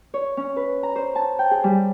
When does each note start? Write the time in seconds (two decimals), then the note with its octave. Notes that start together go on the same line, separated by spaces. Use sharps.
0.14 C#5
0.37 C#4
0.56 B4
0.83 A#5
0.96 C5
1.15 A5
1.39 G5
1.51 G#4
1.64 G3